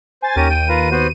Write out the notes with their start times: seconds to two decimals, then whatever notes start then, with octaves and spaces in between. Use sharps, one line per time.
0.22 C5 G#5 A6
0.36 D#2 C#4 G4 A#4 D#7
0.50 G5
0.69 F4 A#4 B4
0.91 B3 F#4 C5